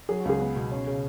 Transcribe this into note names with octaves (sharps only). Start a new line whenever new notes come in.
F#3 G#4
F#4
C#2 G#4
B3
B2
C#4
C#3